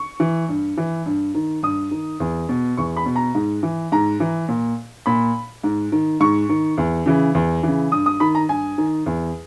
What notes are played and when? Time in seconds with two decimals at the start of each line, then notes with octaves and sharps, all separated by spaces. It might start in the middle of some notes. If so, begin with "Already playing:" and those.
Already playing: C#6
0.20 E3
0.49 G2
0.77 E3
1.06 G2
1.35 D#3
1.63 G2 D#6
1.91 D#3
2.20 E2
2.49 B2
2.77 E2 C#6
2.97 B5
3.06 B2
3.16 A#5
3.35 G#2
3.63 E3
3.92 G#2 A#5
4.20 E3
4.49 A#2
5.06 A#2 B5
5.64 G#2
5.92 D#3
6.20 G#2 C#6
6.49 D#3
6.77 E2
7.06 C#3 E3
7.35 E2
7.63 C#3 E3
7.92 G2 D#6
8.06 D#6
8.20 D#3 B5
8.35 A#5
8.49 G2 G#5
8.78 D#3
9.06 E2